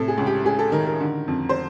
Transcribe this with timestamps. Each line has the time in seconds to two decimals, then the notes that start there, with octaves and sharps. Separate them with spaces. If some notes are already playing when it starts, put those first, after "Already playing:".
Already playing: A2 C3 A4
0.08 G#4
0.17 C#2
0.26 G4
0.45 C#2 G#4
0.59 A4
0.72 D#3 A#4
0.86 A#4
1.00 D3
1.28 F2
1.49 C5